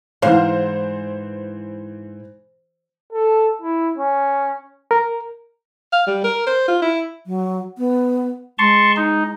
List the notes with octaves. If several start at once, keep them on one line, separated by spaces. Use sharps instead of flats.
G#2 E3 C5 F5
A4
E4
C#4
A#4
F5
G3
A#4
C5
F4
E4
F#3
B3
G#3 A5 C6 C#6
D#4